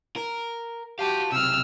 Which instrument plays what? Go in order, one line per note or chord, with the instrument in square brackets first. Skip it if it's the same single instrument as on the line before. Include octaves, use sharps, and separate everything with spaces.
[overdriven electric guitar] A#4
[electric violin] F#4 G4 [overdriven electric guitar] F5 A5
[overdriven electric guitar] B1 C3 [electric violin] E6 F6